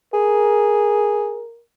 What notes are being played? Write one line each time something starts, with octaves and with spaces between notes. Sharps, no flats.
G#4 A#4